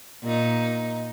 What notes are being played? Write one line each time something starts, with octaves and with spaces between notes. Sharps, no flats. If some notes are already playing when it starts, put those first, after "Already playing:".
A#2 D#4